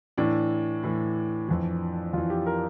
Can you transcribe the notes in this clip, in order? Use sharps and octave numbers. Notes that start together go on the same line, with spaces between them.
A2 E3 D4
A2 E3
F2 E3
F2 E3 F4
G4
A#4